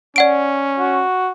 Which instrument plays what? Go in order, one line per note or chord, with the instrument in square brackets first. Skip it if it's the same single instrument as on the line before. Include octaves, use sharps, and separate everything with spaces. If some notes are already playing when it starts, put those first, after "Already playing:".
[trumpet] C#4 [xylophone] D5 F#5 D7
[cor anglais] F#4